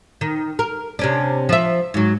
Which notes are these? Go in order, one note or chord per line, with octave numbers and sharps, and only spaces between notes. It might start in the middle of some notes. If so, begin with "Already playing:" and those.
D#3
A#4
C3 C#4 D4
F3 E5
G#2 F#3